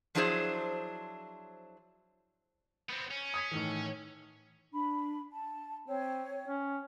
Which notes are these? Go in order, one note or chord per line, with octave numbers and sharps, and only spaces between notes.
F3 F#3 D4 E4 G#4 C5
B3 C4
C#4
D#6 G#6 B6
A2 D#3 E3
D4 B5
A5
C4 C#5
C#4